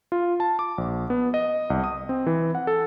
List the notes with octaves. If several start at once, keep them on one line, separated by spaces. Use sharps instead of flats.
F4
A5
D6
A#1
B3
D#5
C2
D#6
C4
E3
F#5
A4